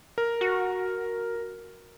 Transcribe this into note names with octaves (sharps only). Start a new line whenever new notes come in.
A#4
F#4